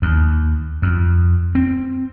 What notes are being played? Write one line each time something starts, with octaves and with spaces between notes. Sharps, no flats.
D#2
F2
C4